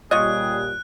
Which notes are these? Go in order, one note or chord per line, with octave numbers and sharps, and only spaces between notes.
A#2 G3 F4 G#4 C#5 D#5 F#6